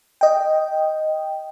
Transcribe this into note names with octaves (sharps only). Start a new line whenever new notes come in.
D#5 G5